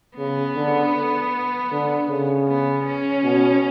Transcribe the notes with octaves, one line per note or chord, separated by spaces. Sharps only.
C#3 B3
D3
D3
C#3
B3
C#4
B2